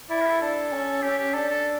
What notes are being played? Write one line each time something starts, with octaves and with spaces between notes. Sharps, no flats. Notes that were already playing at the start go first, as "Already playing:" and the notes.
E4 D5
A#4
G4
A4
D4 A4
C#4
C#4 G4
G4
D4 A4
A4